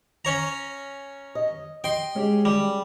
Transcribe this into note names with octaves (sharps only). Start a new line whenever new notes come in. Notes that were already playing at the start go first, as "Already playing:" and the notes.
C#4 C#5 A#5
D#5
D#5 G5 C6
G#3 C#4 G4 G#4
G3